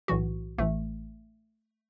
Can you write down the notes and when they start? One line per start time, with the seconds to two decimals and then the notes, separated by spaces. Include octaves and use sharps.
0.08 B1 A2 E3 F#4
0.58 A1 A2 E3 A3